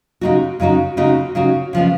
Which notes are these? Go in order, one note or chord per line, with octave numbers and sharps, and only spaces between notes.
C#3 G#3 D#4 F#4
C#3 G#3 D#4 F#4
C#3 G#3 D#4 F#4
C#3 G#3 D#4 F#4
C#3 F3 G#3 B3